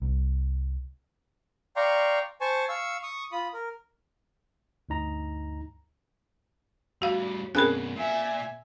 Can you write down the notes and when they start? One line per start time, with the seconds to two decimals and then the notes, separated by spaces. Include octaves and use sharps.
0.02 C2
1.76 D5 F5 G5 A#5 C6 C#6
2.41 C5 G#5 A5 C#6
2.69 F5 C#6 E6
3.03 C#6 D#6
3.32 F4 B5 D#6
3.54 A#4
4.89 D2 G2 D#4 A#5
7.02 A2 G3 F#4 F5
7.55 F#2 B2 C4 C#4 G#4 A#4 B5 F#6
7.96 A#2 E5 G#5